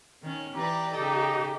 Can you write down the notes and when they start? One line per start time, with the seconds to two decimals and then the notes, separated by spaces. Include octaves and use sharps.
0.22 D#3 C#4
0.55 E3 G4 B4 D5 A#5
0.93 C#3 D#4 A4 D#5 A#5